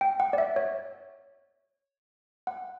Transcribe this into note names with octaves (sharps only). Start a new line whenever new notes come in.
G5
F#5
D5
E5
C#5
F#5